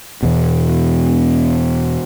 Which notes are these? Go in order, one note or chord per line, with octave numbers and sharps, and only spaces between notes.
E2 B2